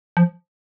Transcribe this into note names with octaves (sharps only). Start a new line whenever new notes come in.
F3